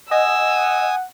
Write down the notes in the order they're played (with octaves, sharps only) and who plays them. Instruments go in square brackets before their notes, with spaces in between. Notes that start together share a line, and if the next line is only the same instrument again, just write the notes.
[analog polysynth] D#5 [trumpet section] F#5 [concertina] G#5 D#6 [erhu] E6